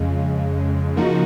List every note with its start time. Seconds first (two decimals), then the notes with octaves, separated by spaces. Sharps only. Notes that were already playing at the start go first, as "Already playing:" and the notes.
Already playing: F2 C#3 G#3
0.96 C#3 F3 A#3 D#4 F#4